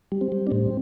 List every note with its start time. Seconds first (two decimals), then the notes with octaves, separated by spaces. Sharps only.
0.12 G3
0.21 C4
0.32 G3
0.47 D4
0.51 A2 C4